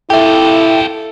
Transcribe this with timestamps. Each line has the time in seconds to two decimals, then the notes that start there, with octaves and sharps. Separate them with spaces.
0.10 E4 F4 G4 A4 E5 G5